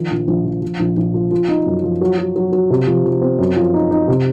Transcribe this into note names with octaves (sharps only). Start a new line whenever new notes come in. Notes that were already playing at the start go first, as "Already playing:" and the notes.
Already playing: D#3 F3
A#1
A#1
F3
F3
A#1
A#1
F3
F3
D#4
F#2
F3
F#3
F#3
F#3
F#3
C3
F3
F3
C4
F#2
F3
D#4
D#4
C3